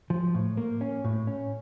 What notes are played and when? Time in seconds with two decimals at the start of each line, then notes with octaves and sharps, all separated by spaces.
0.10 F3
0.34 A2
0.57 A#3
0.81 C#4
1.04 A2
1.27 C#4